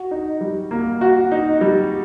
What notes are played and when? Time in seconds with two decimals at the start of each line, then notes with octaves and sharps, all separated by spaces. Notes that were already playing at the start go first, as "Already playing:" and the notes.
Already playing: F#4
0.11 D#4
0.41 G3
0.71 A#3
1.01 F#4
1.32 D#4
1.61 G3